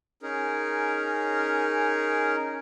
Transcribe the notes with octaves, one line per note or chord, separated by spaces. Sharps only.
C#4 D#4 G#4 A#4